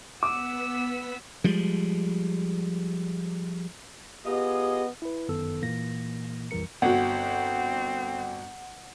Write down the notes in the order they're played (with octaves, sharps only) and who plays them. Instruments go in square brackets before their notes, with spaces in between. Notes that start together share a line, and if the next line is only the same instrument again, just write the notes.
[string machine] B3 B6 [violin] F#5 E6 [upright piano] D6
[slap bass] F3 G3 G#3
[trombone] B3 [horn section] F4 G#4 D#5 [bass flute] G4
[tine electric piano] E4 B4
G1 F#2 D#3 B3 A4 E6
A#2 E3 A#3 A#6
A#1 F2 E3 G3 A#4 C#7
[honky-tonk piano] G1 F#4 [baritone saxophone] C4 [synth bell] F#5